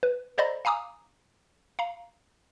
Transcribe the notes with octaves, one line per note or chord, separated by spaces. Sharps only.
B4
A4 C5 D5 D#5 A#5 B5
F5 G#5 A#5 D6 D#6
F5 A#5